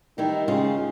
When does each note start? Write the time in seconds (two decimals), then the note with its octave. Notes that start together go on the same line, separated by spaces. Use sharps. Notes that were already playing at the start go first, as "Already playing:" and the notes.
0.18 D#3 G3 D#4 E4
0.48 C#3 G#3 F4